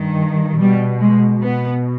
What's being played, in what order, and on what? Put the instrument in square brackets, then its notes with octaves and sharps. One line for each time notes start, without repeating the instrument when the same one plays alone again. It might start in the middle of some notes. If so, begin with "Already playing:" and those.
Already playing: [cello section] G2 D#3
B2 G3
G#3
B2 B3